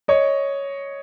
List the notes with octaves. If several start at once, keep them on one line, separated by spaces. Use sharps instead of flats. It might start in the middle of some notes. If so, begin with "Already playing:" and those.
C#5 D#5